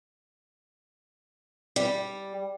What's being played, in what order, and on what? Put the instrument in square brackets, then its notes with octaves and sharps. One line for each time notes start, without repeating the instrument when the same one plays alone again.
[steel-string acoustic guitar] G3